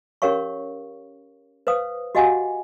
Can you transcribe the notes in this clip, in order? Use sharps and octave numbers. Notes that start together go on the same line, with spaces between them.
C#4 G4 A#4 C#5 F5 C#6
B4 C5 F5 D#6
F#4 G4 D#5 F5 F#5 G#5